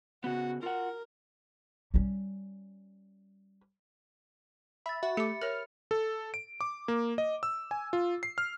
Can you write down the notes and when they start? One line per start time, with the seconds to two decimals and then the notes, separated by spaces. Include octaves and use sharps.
0.24 C#3 B3 F#4
0.63 F4 A#4 F#5
1.94 G3 C#4
4.86 E5 B5 A6
5.03 F#4 E5
5.17 A3 G4 D6 C#7
5.42 A#4 C#5 F6
5.91 A4
6.34 D7
6.61 D6
6.88 A#3
7.18 D#5
7.43 E6
7.71 G#5
7.93 F4
8.23 C7
8.38 F6